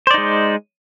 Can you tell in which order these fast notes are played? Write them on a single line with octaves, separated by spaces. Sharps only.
C5 D5 D#4 G#3